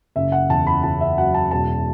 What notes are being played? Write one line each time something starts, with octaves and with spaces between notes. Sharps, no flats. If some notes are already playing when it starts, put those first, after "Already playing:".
F#1 E5
F#5
E2 A5
B5
C#3 A5
E5
F#3 F#5
A5
E1 A5